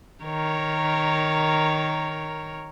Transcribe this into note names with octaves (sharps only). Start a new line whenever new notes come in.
D#3 A#4 C#5